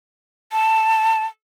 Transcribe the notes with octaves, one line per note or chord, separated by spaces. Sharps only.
A5